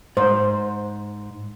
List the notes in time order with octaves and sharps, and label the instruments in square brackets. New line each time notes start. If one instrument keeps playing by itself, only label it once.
[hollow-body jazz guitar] G#2 [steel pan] C5